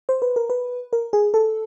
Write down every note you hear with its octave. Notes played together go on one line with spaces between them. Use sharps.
C5
B4
A#4
B4
A#4
G#4
A4